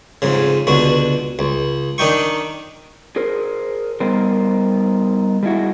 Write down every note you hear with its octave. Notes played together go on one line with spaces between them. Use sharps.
F2 G#2 C#3
C#2 B2 D3 F#4
C#2
D#3 D4 D#4 G5 C#6
G#4 A#4 C5
G3 B3 D#4 A#4 C5
G3 G#3 E4 F#4